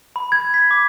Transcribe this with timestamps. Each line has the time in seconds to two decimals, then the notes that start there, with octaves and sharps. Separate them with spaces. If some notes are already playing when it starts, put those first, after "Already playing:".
0.16 B5
0.32 G#6
0.54 B6
0.71 D6